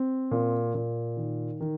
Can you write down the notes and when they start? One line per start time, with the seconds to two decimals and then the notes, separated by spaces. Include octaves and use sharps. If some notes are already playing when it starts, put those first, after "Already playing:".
Already playing: C4
0.31 A#2
0.74 A#2
1.17 D#3
1.60 D#3